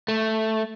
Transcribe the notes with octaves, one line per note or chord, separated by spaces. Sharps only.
A3